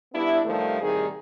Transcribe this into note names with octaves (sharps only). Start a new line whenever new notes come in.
G3 B3 D4 E4
G2 D#3 F3 G3 A3
A2 C3 D#3 G3 D#4 G#4